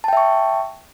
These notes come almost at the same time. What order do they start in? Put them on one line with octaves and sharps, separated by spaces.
A5 G5 E5 C#6